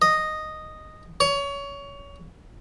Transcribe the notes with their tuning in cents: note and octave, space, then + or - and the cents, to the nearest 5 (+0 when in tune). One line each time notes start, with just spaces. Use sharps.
D#5 -5
C#5 +25